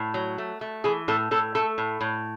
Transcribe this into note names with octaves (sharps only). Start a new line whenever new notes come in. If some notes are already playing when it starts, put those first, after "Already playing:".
Already playing: A2
F#3
A3
A3
E3 G#4
A2 A4
A2 A4
A3 A4
A2
A2